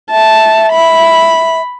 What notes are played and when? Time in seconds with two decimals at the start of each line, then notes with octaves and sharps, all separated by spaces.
0.11 E5 A5
0.72 B5